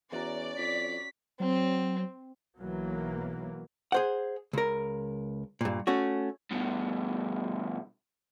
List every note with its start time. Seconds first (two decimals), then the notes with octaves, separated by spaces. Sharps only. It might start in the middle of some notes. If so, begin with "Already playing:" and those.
0.12 E2 C#4 F#4 D5 A#5
0.58 F2 B6
1.40 F#3 C4
2.59 B1 E3 F#3 A#3
3.92 G#4 C5 F#5
4.53 C#2 A#4
5.61 G2 A#2
5.87 A3 C#4 F#4
6.51 G2 B2